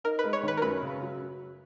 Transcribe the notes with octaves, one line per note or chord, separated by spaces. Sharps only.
D#4 A#4
G#3 B4
C#5
D#3
B4
A#4
F#2 B4
C#3
F#3